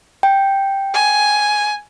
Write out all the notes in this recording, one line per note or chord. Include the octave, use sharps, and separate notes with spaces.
G5
G#5